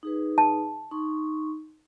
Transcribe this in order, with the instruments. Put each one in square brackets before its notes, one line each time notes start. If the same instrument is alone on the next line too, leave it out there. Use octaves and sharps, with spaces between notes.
[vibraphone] D#4 G#4 B4
[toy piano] A5
[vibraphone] D#4 C6 C#6